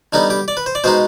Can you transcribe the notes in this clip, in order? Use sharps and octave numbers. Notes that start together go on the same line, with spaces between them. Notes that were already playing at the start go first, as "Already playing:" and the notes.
D3 G3 B3 D#4
G4
D5
B4
C5
D5
B2 G#3 B3 D#4 C5